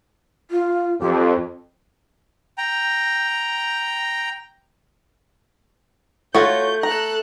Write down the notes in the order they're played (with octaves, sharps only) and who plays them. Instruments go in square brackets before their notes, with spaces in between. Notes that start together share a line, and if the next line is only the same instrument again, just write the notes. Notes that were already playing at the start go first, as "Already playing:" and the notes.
[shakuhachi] F4
[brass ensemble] F2 [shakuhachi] G4
[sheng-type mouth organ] G5 A#5
[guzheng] A3 [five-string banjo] F4 F#4 C#5 [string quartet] G6
[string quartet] A4 F#6 [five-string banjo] A#5